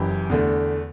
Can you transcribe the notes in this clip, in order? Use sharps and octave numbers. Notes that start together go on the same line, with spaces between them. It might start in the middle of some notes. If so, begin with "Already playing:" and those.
Already playing: F#1 F#2 E3 G4
E2 D3 A3